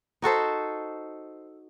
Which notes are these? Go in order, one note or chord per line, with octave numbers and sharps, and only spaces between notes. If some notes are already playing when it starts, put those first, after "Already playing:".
D#4 F#4 A4 C5